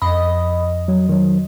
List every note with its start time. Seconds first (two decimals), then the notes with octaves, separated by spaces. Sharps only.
0.02 F2 D#5 B5
0.88 F#3
1.09 D#3 F#3